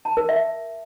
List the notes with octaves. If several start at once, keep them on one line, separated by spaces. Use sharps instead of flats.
A5
A#4
E5